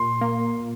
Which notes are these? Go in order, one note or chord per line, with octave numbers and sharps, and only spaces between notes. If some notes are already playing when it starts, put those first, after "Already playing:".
Already playing: A#2 C6
A#3